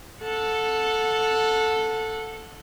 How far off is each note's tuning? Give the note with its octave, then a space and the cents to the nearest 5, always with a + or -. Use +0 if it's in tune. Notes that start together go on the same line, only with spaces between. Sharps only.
A4 +0 F#5 -25